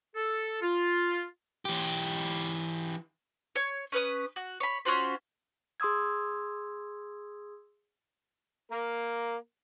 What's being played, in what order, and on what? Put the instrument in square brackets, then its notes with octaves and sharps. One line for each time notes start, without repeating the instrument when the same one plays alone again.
[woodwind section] A4
F4
[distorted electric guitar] E3 G4
[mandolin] C#5
C#4 B4 D#6
F#4
C#5 B5
C#4 F4 F#4 C5
[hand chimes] G#4 C6 D#6 E6 G#6
[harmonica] A#3 A#4